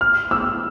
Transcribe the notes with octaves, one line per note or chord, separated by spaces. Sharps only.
F6
E6